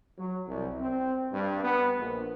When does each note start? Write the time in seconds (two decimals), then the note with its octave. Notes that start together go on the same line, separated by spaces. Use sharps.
0.17 F#3
0.47 C2
0.80 C4
1.33 G2
1.64 B3
1.98 A#1